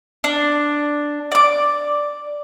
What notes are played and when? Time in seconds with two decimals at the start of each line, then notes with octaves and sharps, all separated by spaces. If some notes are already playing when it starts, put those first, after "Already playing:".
0.24 D4
1.32 D5 D6